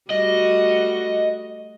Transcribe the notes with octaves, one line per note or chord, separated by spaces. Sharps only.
G3 A3 F#4 D#5